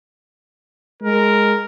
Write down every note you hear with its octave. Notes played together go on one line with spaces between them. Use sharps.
G#3 A#4